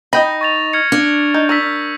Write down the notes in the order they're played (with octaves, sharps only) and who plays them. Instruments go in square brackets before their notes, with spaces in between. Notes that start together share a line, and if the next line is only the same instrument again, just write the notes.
[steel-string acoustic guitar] D#4 [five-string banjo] D#5 G5 B5 [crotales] A#6
[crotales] C#6 A6 F7
F6 G#6 C#7
[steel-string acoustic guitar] D4
[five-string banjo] D#4 [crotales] G6
[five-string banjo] A#4 [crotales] C#6 E6 B6